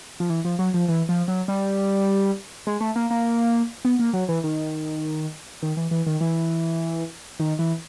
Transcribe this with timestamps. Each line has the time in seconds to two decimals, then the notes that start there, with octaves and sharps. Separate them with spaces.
0.20 F3
0.30 E3
0.45 F3
0.59 F#3
0.74 F3
0.88 E3
1.09 F3
1.28 F#3
1.48 G3
2.67 G#3
2.80 A3
2.96 A#3
3.10 A#3
3.85 B3
3.99 A#3
4.13 F#3
4.29 E3
4.44 D#3
5.62 D#3
5.77 E3
5.91 E3
6.06 D#3
6.21 E3
7.40 D#3
7.59 E3